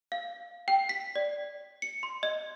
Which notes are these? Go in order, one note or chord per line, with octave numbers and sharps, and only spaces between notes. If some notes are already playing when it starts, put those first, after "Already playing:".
F5
G5
B6
D5
C#7
C6
D#5